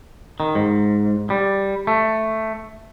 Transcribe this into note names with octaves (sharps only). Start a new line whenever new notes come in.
D#3
G#2
G3
A3